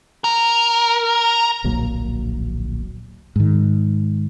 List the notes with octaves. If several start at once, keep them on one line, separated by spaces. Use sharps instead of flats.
A#4
D1 A#1 F#3 A#3
G#2 D#3